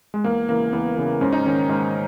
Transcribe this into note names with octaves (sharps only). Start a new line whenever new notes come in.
G#3
E2 A#3
C#3 E3 A#3
E2 B3
C#3 E3
G#2 C#4
D#4
D#3 C#4
G#2